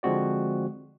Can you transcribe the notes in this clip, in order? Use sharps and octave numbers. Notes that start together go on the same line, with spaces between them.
D3 F3 G#3 C4 F#4 D5